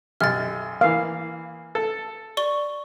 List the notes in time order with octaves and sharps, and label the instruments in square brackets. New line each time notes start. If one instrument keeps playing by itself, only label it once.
[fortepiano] B1 F#2 C3 [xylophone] F6 A6
[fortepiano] E3 A#3 [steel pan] F5
[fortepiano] A4
[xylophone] D5 C#6 G7